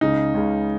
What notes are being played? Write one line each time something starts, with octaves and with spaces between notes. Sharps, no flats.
C#2 C#3 D#4
C#2 C#3